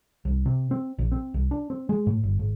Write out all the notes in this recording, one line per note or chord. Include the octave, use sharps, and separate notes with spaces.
C2
C3
C4
A#1
C4
C2
D4
C4
G#3
A2
G1
G#1